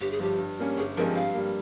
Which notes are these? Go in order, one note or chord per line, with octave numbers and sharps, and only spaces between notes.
G1 G4
G#4
G2 F3 G4
G2
G3 A#3 C#4
G1 G#4
G2 F3 G#3 C4 A#4
G2 F5
G3 A#3